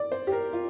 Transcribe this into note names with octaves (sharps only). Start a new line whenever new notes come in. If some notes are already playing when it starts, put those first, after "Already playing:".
Already playing: D5
C5
G4
A#4
F4